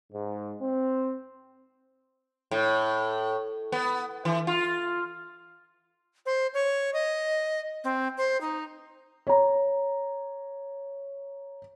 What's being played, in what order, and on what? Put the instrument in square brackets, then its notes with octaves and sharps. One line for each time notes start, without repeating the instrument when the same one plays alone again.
[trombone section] G#2
C4
[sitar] A2
B3
E3
F4
[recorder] C5
C#5
D#5
C4
C5
D#4
[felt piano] C#5 A#5